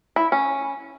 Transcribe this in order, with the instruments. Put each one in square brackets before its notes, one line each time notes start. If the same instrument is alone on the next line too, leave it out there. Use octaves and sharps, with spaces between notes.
[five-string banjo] E4
C#4